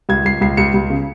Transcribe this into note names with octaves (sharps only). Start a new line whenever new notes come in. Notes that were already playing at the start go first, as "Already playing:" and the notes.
C#2 G#6
C#2 C7
C#2 C7
C#2 C#7
C#2
C#3